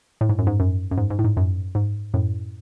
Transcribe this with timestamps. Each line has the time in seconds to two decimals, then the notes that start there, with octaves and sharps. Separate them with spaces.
0.21 A2
0.29 G#2
0.38 F#2
0.47 G#2
0.60 F#2
0.91 F#2
0.98 G#2
1.10 G#2
1.19 A2
1.24 G#2
1.37 F#2
1.75 G#2
2.14 F#2 A2